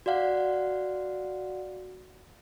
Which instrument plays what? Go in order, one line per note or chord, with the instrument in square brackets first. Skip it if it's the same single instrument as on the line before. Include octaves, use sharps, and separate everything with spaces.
[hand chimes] F#4 D5 F5 F#5